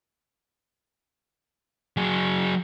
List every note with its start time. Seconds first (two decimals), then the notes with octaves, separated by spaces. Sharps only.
1.97 F#3 G#4